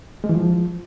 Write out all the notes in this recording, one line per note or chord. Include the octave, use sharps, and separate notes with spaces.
G#3
E3
F3